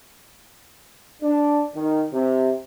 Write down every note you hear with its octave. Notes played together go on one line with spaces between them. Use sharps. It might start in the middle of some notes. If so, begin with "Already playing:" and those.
D4
D#3
C3